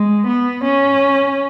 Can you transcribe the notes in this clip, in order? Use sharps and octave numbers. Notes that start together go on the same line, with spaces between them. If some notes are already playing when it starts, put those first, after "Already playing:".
Already playing: G#3
B3
C#4